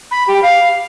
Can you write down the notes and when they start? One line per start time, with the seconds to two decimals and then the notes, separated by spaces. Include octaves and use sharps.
0.11 B5
0.27 G4
0.43 F5